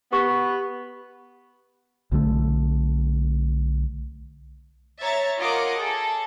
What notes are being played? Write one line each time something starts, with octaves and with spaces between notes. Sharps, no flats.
B3 G4 C#6
B1 D3 F3 A3
C#5 E5 A#5 A6
F4 A#4 C#5 D#5 F#5 D6
G#4 A4